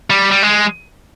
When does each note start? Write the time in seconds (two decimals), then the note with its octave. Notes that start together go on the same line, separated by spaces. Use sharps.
0.10 G3
0.32 G3
0.43 G#3